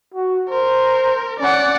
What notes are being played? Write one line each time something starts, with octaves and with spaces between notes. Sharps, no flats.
F#4
A#4 C5
C#4 D5 F#5